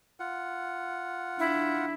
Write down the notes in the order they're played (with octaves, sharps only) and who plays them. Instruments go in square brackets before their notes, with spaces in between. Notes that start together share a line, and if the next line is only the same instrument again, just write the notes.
[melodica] F4 F#5
[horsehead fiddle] D4 [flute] E4